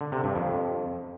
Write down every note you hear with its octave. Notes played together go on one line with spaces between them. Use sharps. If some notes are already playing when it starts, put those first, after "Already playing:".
D3
C3
G2
F2